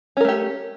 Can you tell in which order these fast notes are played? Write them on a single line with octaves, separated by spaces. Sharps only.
C#4 A#4 A3 G4